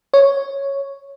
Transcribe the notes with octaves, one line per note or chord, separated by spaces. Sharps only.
C#5